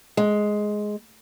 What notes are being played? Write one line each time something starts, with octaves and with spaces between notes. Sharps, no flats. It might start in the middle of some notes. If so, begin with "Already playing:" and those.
G#3